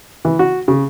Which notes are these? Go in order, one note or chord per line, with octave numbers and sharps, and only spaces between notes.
E3
F#4
C#3